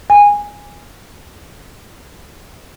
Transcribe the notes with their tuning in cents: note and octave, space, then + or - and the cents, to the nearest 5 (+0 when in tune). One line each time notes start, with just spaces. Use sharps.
G#5 -15